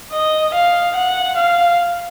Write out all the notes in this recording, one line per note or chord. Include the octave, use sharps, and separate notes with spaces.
D#5
F5
F#5
F5